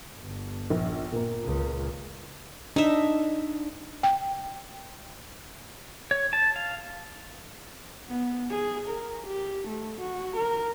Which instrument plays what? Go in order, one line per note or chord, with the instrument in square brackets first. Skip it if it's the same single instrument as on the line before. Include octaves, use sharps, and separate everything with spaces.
[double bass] G1
[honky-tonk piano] A#1
A#2 A#3
[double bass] C#2
[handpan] D4 [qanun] D#4 E5
[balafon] G5
[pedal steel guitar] C#5
A5
F5
[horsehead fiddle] B3
G#4
A#4
G4
A3
F#4
A#4